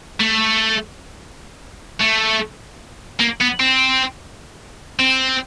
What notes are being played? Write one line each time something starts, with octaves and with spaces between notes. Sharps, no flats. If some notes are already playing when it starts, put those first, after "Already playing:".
A3
A3
A#3
B3
C4
C4